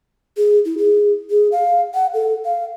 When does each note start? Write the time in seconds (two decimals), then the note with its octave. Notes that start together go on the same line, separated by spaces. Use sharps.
0.37 G#4
0.65 E4
0.78 G#4
1.30 G#4
1.52 F5
1.94 F#5
2.14 A4
2.45 F5